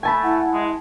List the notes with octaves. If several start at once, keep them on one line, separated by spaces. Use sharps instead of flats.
A3 G#5 A5 B5
E4 F#5
G#3